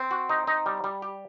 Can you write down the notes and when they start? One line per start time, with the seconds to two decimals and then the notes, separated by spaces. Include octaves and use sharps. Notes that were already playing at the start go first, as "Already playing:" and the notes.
Already playing: C4
0.11 F#4
0.29 D#4
0.47 D#4
0.66 G3
0.84 G3
1.02 G4